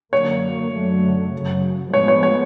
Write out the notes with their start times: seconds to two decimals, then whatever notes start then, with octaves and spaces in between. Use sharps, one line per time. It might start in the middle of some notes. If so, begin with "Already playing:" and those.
0.13 F#2 D3 F#3 A#3 C#5
0.72 F#2 D3 F#3 A3
1.33 F#2 C#3 F#3
1.93 A2 F3 G#3 B3 C#5
2.08 C#5
2.23 C#5